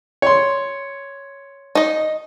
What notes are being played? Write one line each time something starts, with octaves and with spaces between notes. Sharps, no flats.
C#5 C6
D#4 D#5